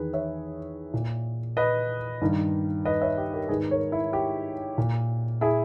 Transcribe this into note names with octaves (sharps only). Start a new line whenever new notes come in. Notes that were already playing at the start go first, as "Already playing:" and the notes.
Already playing: E2 D#3 G#4 B4
C#5 E5
A#2
B4 D#5
G2 D#3
B4 D#5
C#5 E5
G4
G4 A#4
G#2 D#3 G#4 B4
A#4 C#5
E4
G4
A#2
E4 G#4